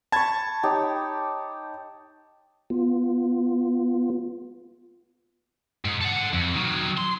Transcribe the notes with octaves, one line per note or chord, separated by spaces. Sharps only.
A5 B5 C#6 G#6
D#4 G4 C#5
B3 F4
G#2
A4 F#5
F2
D#3 F#3
C6